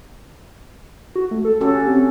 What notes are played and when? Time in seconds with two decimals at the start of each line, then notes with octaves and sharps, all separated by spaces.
1.15 F#4
1.31 A3
1.45 A4
1.61 C#4 F#4 G4 A4
1.76 G4
1.88 C4